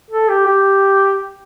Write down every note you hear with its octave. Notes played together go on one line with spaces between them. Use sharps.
A4
G4
G4